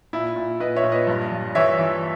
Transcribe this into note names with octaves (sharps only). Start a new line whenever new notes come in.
A#2 E4
A#2
A#2 B4 D#5
C#5 E5
A#2
B4 D#5
G2
G2
E3 C#5 E5
E3